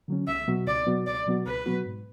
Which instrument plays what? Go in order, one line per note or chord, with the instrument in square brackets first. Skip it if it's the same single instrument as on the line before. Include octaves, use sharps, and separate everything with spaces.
[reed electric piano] D3 F#3 C#4
[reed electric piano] C#2 [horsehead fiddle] E5
[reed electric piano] B2 F#3 B3 F#4
[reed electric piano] C#2 [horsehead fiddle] D5
[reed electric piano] B2 F#3 B3 F#4
[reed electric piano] C#2 [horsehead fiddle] D5
[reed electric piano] B2 F#3 B3 F#4
[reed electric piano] C#2 [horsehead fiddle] B4
[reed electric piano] B2 F#3 B3 F#4
G#2